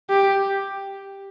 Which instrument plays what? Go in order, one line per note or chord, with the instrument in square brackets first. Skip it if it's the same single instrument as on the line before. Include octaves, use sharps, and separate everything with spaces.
[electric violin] G4